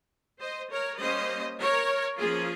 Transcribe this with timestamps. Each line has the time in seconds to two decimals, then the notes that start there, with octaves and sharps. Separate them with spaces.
0.40 C5 D#5
0.71 A#4 C#5
1.00 G3 A#3 C#4 C5 D#5
1.60 A#4 C#5
2.19 F3 A#3 C#4 F4 G#4